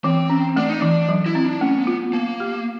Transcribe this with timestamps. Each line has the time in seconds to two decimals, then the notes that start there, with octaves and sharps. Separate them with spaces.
0.04 E3 C4
0.30 C#4
0.56 A3 D4
0.69 D#4
0.80 E3 D4
1.09 F#3
1.26 E4
1.35 C4
1.44 D4
1.61 A3 C#4
1.78 B3
1.87 F4
2.13 A#3 B3
2.40 G4